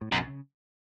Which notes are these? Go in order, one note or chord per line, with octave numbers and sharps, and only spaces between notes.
A2
B1 F#2 B2
C#3